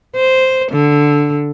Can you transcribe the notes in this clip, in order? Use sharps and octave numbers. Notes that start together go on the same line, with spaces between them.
C5
D3